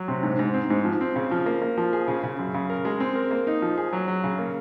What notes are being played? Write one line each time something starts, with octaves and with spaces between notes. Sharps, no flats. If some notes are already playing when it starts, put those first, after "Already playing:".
Already playing: F#3
C3
G#2
G#2
C4
G#2
F3
C4
C#3
F3
A#3
A#3
F3
G#4
C#3
C#3
F#2
C#3
A#4
G#3
C4
A#4
A#3
D#4
F3
G#4
F#3
F#3
C#3
A#3